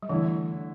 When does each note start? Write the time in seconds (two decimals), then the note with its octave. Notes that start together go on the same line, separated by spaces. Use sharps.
0.03 G3
0.09 D3 E3 A3 E4